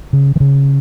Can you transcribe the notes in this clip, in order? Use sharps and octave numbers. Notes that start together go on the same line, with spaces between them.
C#3
E3
C#3